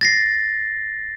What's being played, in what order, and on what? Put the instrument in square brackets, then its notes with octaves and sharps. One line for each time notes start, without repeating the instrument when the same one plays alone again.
[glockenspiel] A6 A#6 C7